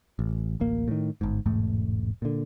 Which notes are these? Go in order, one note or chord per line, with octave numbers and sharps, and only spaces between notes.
A1
D1 A1 A#3
A2 D#3
G1 G#2
E1 A1 G#2 A3
A#2 D3